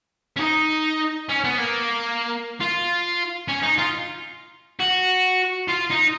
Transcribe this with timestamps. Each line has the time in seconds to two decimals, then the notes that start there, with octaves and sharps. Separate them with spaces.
0.37 C#4
0.40 D#4
1.29 C#4
1.44 B3
1.57 A#3
2.61 F4
3.48 C#4
3.63 D#4
3.78 F4
4.80 F#4
5.68 F4
5.90 D#4